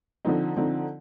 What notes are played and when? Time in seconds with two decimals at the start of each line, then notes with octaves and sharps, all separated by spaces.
0.25 D3 F3 C4 D#4
0.57 D3 F3 C4 D#4